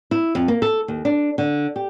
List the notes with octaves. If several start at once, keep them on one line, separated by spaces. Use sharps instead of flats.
E4
F2
A#3
A4
D#2
D4
D3
G4